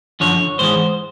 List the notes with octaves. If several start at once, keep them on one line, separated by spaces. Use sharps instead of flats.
F#2 D3 F3 C#5
G#2 E3 G#3 C5